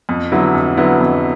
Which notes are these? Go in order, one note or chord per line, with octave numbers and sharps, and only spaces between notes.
F2
D3 F#3 B3 E4
F2
D3 F#3 B3 E4
F2